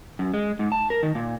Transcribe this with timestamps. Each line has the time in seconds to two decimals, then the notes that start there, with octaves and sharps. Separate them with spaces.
0.19 F#2
0.34 G#3
0.59 G#2
0.72 A5
0.90 A#4
1.03 D#3
1.15 A#2